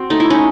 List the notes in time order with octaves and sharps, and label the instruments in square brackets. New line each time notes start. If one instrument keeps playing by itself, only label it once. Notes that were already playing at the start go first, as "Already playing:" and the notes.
Already playing: [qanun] C4 F#4
A3 D#4
E4
C#4 D#4